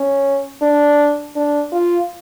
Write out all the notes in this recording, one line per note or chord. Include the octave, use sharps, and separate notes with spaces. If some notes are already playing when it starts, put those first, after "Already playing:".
Already playing: C#4
D4
D4
F4